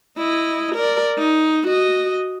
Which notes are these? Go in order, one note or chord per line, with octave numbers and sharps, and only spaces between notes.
E4 D#5
A#4 D5
D#4
F#4 D#5